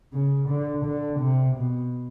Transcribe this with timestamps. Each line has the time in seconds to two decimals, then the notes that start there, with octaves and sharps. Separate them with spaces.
0.13 C#3
0.49 D3
0.85 D3
1.20 C3
1.56 B2